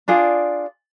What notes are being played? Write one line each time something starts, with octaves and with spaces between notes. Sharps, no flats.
D4 F4 G#4 D5